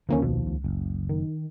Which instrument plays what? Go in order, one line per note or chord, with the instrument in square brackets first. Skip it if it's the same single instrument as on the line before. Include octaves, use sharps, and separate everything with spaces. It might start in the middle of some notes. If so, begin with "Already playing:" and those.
[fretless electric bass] D#2 F3 [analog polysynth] D3 A#3 C#4
[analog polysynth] C2 B2
C#2
[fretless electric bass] F#1
[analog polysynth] D#3